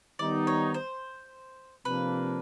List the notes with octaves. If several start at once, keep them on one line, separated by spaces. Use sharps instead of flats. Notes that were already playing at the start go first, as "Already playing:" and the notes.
D#3 G3 B3 D#4 D5
C#5
C5
C3 F3 A#3 D4 B4